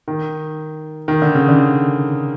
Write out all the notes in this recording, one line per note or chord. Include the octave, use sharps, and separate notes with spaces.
D#3
D#3
D3
C#3
D3